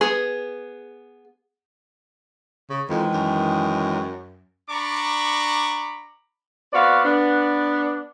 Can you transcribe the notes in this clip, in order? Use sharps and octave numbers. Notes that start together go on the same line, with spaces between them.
B3 G#4
C#3
F2 D#3 E3 G#3
F#2
D4 A#5 B5 C#6 D6
B3 C4 F#4 D5 F5
B3 D4